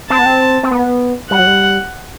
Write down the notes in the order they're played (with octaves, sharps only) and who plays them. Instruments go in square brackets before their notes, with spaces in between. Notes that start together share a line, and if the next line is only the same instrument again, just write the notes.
[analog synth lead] C4 [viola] A5
[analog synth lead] B3
C4
C4
B3
[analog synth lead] G3 [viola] F#5
[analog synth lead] F#3
G3